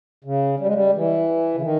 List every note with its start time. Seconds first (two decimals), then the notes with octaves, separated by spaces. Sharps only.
0.24 C#3
0.60 G3
0.66 G#3
0.74 G3
0.94 E3
1.55 C#3
1.62 D#3